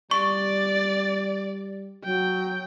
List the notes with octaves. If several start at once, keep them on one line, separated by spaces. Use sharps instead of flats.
G3 D5 C#6
F#3 G5